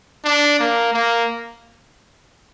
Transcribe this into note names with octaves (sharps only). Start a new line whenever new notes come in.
D4
A#3
A#3